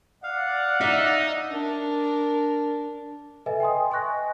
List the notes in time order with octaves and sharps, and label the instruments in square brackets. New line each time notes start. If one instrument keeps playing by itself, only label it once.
[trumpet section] D5 F#5 [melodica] F5
[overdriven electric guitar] D#4 [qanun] E5
[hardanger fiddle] D4 A#4
[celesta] A4 B4 D#5 E5 G#5
G5 G#5 C6 D#6
D#5 G#5 C#6 F#6 A#6